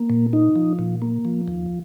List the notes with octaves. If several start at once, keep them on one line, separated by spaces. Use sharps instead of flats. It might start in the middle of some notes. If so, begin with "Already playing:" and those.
Already playing: A#3
A#2
D#4
F3
A#2
A#3
F3
D#2